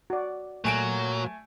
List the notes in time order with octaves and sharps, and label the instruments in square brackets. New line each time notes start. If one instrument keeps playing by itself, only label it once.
[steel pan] F#4 D5
[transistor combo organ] A#2 [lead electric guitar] F#3 [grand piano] A3 G#5 D7